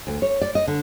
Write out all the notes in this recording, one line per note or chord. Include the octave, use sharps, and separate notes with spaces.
D2
C#5
D5
D#5
D3